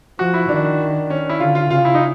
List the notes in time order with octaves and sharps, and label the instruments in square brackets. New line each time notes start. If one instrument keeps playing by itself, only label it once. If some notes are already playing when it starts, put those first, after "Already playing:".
[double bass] F3 [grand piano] F#4
[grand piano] E4
[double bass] D#3 [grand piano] D4
[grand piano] C#4
E4
[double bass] D3 [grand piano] F4
[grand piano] F4
[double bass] C#3 [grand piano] F4
[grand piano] E4
D#4